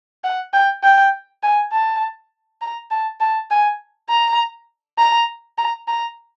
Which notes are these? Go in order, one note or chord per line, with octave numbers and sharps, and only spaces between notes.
F#5
G5
G5
G#5
A5
A#5
A5
A5
G#5
A#5
A#5
A#5
A#5